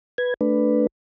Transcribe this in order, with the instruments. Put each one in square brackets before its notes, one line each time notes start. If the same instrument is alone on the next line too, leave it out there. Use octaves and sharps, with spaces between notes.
[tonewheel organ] B4 G#6
A3 D4 B4